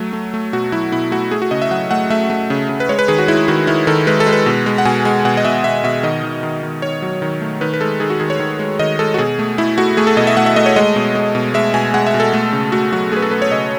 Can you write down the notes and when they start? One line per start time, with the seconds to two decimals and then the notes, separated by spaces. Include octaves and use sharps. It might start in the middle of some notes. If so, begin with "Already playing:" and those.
Already playing: F#3 A3
0.13 A3
0.34 A3
0.53 B2 F#4
0.72 F#3 E4
0.92 B2 E4
1.11 A3 F#4
1.31 A3 G#4
1.42 F#4
1.51 C#3 D#5
1.62 E5
1.71 F#3 F#5
1.91 A3 F#5
2.10 A3 E5
2.30 A3
2.50 C#3
2.69 C#3
2.80 B4
2.89 G#3 C#5
2.99 B4
3.08 D#3 G#4
3.18 F#4
3.28 G#3 E4
3.48 D#3 F#4
3.67 D#3 E4
3.87 D#3 A4
4.07 G#3 B4
4.20 A4
4.26 G#3
4.33 B4
4.46 B2
4.66 G#3
4.78 F#5
4.85 B2 G#5
5.05 G#3 G#5
5.25 B2 F#5
5.37 D#5
5.45 B2 E5
5.64 B2 E5
5.84 B2 E5
6.03 D#3 D#5
6.23 D#3
6.43 D#3
6.63 D#3
6.82 D#3 C#5
7.02 F#3
7.22 D#3
7.41 A3
7.61 D#3 B4
7.74 B4
7.81 G#3 A4
8.00 D#3 G#4
8.10 F#4
8.20 D#3 G#4
8.30 C#5
8.40 D#3
8.59 G#3
8.79 D#3 D#5
8.99 G#3 A4
9.14 F#4
9.18 B2 G#4
9.39 A3
9.58 A3 E4
9.78 A3 F#4
9.97 A3 G#4
10.07 A4
10.17 B2 D#5
10.27 E5
10.37 A3 F#5
10.46 E5
10.56 A3 D#5
10.66 C#5
10.76 G#3 D#5
10.96 B2
11.15 G#3
11.35 B2
11.54 G#3 E5
11.74 B2 G#5
11.94 G#3 F#5
12.07 E5
12.14 B2
12.20 A4
12.33 A3
12.53 C#3
12.72 A3 F#4
12.92 F#3 F#4
13.12 A3 G#4
13.17 B4
13.22 A4
13.31 A3 B4
13.42 C#5
13.51 C#3 D#5